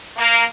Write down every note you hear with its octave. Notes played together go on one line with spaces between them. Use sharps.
A#3